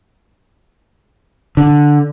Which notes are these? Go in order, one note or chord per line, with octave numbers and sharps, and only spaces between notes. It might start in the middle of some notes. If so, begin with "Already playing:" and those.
D3